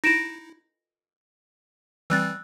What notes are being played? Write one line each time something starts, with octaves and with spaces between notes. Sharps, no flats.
D#4 E4 A#6 D7 E7
E3 G3 C4 E6 F#6 A6